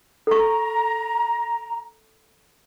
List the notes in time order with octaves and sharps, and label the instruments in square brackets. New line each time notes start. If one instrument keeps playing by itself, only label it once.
[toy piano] A4 C#6 [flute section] A#5